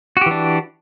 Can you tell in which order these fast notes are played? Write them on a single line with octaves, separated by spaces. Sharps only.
F#4 G4 E3 D4